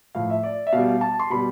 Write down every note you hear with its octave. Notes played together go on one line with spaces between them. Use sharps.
A2 F3 F5
E5
D5
E5
B2 F5
G3
F5
A5
C6
B2 G3 B5